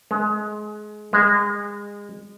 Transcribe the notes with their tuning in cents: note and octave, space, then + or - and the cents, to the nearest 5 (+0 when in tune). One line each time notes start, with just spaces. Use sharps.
G#3 +25
G#3 -25